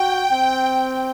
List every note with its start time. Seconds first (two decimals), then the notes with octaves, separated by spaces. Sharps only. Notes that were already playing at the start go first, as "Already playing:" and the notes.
Already playing: F#4 G5
0.32 C4